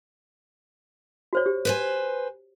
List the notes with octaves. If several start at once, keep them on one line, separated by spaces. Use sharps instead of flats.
F#4 C5 C#5
G4
B4 C5 G#5